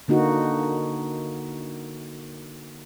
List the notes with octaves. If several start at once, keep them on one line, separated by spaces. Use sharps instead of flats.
D3 A#3 D#4 F#4